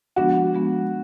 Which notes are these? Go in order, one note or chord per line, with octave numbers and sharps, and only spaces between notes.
F3 G#3 B3 D4 F#4
F3 G#3 B3 D4